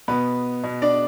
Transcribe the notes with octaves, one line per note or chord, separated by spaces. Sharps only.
B2 B3 B4
B2
D4 D5